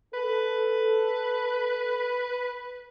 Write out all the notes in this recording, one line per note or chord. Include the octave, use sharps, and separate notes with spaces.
A4 B4